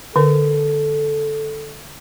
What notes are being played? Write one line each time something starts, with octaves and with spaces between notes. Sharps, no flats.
D3 A4 A#4